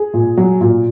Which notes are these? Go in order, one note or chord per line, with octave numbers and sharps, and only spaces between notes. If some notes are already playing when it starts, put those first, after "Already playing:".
Already playing: G#4
A#2
F#3
A#2